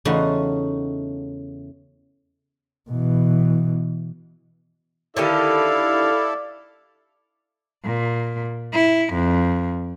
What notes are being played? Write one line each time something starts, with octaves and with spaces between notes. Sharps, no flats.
E2 C#3 A3 D#4 F#4 C6
B2 E3
D3 D#3 E4 G4 A4 D5 F5
A#2
E4
F2